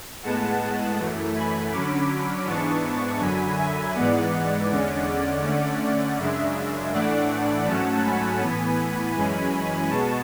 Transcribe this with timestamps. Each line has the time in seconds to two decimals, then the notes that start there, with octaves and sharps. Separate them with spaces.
0.22 A2 G#3 B3 F#5 A5
0.97 F#2 E3 A3
1.35 G#5 B5
1.71 D3 F#3 C#4 B5 D6
2.46 G#2 E3 B3 D4 A5 C#6
3.20 F#2 D3 F#3 G#5 B5
3.58 E5 G#5
3.95 G#2 E3 G#3 B3 D5 F#5
4.69 E2 D3 G#3 C#4
5.43 D3 A3 C#4
6.18 F#2 C#3 G#3 D4 E5
6.92 A2 E3 A3 D4 D5 F#5
7.66 G#2 F#3 A3 C#4 F#5 A5
8.03 G#5 B5
8.41 A2 E3 B3 G#5 B5
9.16 F#2 E3 G#3 C#4
9.89 B2 G#3 B3 A5 C#6